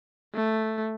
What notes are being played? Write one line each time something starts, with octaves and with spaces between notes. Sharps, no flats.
A3